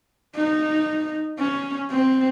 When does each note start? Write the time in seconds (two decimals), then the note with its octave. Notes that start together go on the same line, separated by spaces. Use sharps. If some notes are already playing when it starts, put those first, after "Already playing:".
0.35 D#4
1.39 C#4
1.91 C4